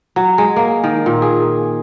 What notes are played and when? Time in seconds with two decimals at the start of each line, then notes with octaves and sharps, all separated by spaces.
0.16 F#3
0.38 G#3
0.56 A#3
0.84 D#3
1.06 A#2
1.22 G#4